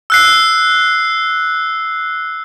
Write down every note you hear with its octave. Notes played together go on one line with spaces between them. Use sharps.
E6 F#6 C7